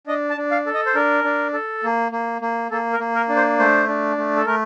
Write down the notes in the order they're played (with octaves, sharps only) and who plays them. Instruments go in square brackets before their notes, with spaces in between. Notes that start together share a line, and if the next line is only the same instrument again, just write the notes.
[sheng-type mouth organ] D4 D#5
A5
D4
F5
A4
D#5
C5
D4 A#4
D4
A4
A#3
A#3
A#3
A#3 A4
A#4
A#3
A#4
D4
C5
A3 C5
D4
A3
A4
A3 A#4